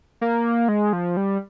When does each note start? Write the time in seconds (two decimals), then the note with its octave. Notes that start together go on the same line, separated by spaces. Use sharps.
0.21 A#3
0.68 G#3
0.93 F3
1.17 G3